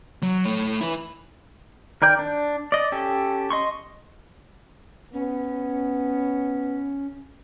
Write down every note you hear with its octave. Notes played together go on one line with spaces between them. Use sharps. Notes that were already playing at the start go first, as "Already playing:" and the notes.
F#3
A3 C#5
E4 B4
D#3 A#4 D5 G5
D4
D5 D#5
C#4 G4 A4
D#5 C6 C#6
B3 C#4